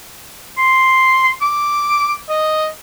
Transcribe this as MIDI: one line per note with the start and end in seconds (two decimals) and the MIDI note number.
0.58 1.31 84
1.42 2.14 86
2.29 2.66 75